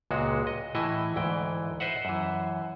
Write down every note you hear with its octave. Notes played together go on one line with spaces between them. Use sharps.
C#2 A#2 G#3 F#4
D#5
A2 E3 E4 D#5 E5 G#5
D2 G#2 E3 G5
B4 C5 D#5 E5 F#5
F#2 E3